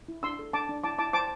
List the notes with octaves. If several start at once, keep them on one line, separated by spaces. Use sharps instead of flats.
E4
D4 C6 E6
A4
D4 A5 D6
D4
E4 A5 D6
E4 A5 D6
C5 A5 D6